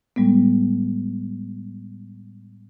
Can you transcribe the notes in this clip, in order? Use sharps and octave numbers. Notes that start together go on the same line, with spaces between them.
A2 G3 G#3 B3